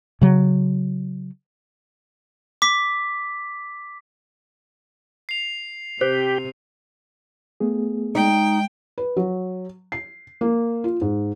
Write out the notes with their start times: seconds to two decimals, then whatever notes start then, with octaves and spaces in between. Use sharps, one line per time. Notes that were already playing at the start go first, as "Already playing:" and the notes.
0.21 C#3 F#3
2.62 D6 B6
5.29 C7 F7
6.01 C3 G4 C5
7.60 A3 B3 G#4
8.15 G#3 D#4 G5
8.98 B4
9.17 F#3
9.92 C7
10.41 A#3
10.84 F4
11.01 G#2